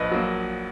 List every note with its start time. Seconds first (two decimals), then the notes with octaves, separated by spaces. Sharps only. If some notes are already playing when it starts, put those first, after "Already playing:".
Already playing: A#1 B4 D#5
0.11 F#3 A#3